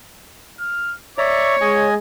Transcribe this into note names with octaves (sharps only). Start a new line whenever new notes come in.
F6
C#5 D5 E5 A#5 C#6
G#3 D#5 G#5